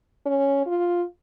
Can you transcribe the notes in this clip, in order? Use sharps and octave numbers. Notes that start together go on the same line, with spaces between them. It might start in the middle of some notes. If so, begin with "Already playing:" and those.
C#4
F4